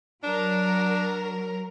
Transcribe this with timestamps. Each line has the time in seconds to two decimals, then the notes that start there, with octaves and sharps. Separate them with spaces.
0.24 F#3 D4 A#4